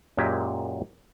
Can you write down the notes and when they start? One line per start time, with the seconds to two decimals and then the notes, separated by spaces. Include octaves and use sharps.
0.17 F#2 A#2 G#3 G4 E5 G#5